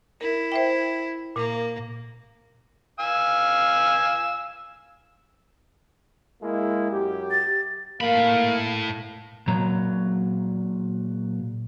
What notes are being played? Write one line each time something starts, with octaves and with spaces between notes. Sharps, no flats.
E4 A#4
C5 E5 G5
A#2 A#3
F5 G#5 E6
G#3 A#3 E4
F#2 G4
A6
A2 A#3 F5 B5
A#2 F#3 A#5